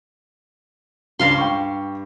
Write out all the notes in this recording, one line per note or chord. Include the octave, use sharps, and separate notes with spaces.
C#2 G2 F5 C6
G5 C#6